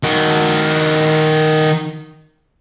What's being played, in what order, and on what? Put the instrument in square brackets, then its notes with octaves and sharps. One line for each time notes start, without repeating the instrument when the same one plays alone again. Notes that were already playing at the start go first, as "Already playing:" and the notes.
[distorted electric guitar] D#3 F#4